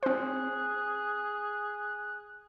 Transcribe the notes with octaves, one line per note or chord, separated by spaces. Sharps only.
C4 G#4 C5 F#6